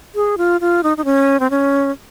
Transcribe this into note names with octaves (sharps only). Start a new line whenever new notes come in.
G#4
F4
F4
D#4
D#4
C#4
C4
C#4